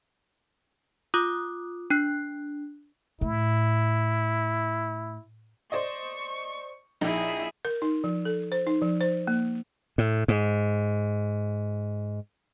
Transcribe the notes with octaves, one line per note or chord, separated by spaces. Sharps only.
F4 D6 D#6 F#6
D4 F#6 C7
A2 E4
C5 D5 D#5 C#6
A#1 D#4 E4 G#4
A#4
D#4
F3
A4
C5
D#4
F3
C5
A#3
A2
G#2